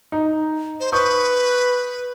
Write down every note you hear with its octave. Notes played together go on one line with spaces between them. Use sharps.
D#4
C5
B4 C#6 D#6 G6